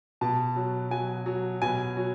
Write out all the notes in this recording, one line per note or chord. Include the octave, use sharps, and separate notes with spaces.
B2 A5
F#3
F#3 G#5
F#3
B2 G#5
F#3